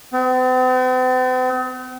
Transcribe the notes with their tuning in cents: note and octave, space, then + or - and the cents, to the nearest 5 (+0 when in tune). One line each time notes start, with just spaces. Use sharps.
C4 -45